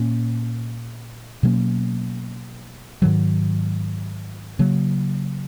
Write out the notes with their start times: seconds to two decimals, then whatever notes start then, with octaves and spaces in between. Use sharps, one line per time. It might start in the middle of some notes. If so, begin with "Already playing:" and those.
Already playing: A#2 A#3 C#4
1.43 B2 F#3 A#3 C#4
3.02 G#2 D#3 F#3
4.59 C#3 F#3 A#3